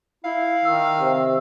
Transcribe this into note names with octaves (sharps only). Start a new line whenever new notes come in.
E4 F5
D#3 E6
C3